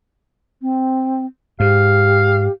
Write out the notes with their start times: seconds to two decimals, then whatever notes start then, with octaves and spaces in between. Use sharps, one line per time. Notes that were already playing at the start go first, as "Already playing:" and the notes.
0.62 C4
1.60 G#2 G4 F5